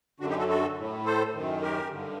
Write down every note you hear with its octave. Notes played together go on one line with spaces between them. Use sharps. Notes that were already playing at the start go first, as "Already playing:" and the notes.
F#2 D3 D4 F#4
D#4 G4
F#4 A4
F#4 A4
A2
A4 C5
F#2 D#3
G4 A#4
G2 D3